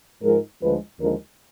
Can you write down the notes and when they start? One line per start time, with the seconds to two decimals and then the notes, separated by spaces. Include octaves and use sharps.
0.23 G#2 F3 G#3 A#4
0.61 D2 D3 F3 G#3 B4
1.00 D#2 D3 F3 G#3 A#4